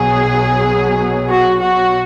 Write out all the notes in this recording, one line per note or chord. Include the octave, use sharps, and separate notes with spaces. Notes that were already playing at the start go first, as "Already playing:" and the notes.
Already playing: B1 B2 F#3 G#4
F#4
F#4